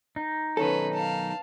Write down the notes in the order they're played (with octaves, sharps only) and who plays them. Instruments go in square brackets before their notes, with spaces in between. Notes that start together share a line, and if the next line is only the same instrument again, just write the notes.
[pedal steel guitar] D#4
[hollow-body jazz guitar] B1 D#3 A4 [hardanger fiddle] C#4 B4
[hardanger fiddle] F5 A5